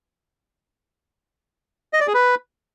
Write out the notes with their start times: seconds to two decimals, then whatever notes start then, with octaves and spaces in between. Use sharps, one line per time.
1.93 D#5
2.00 D5
2.07 G#4
2.14 B4